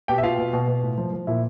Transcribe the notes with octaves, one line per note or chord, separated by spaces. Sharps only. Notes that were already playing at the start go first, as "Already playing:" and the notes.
B2 G4 G5
E5
B2 F4 F5
B2
B2
B2
A2
F3
F3
A#2 E4 E5